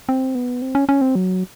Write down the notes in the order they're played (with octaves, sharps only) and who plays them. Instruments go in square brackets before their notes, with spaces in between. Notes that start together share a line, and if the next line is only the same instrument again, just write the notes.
[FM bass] C4
B3
C4
C#4
C#4
C4
F#3